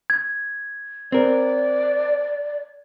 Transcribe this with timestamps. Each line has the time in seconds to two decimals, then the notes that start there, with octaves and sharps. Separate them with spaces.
0.10 G#6
1.12 C4 A#4 D5